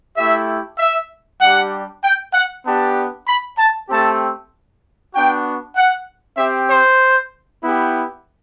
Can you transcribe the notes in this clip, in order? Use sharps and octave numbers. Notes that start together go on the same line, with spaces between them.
A3 E4 G4 E5
E5
G3 D4 G4 F#5
G5
F#5
B3 D4 G4 A5
B5
A5
A3 C4 G4 A5
B3 D4 F#4 G5
F#5
C4 G4 E5
C5
B3 E4 G4